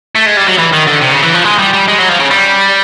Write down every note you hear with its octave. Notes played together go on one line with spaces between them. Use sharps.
A3
G#3
G3
F#3
E3
D#3
D3
C3
C#3
E3
F3
G#3
G3
G3
G#3
F#3
F3
C#3
G3